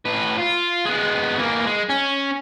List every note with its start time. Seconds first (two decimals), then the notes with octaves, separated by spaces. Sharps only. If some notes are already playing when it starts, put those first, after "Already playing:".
0.05 A2 B4
0.38 F4
0.86 G#3 B3
1.39 E3 A#3
1.67 G#3
1.90 C#4